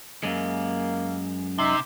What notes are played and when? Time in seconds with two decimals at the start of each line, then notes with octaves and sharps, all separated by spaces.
0.23 F#2 G#3 A#3
1.58 C3 D#4 E5 C6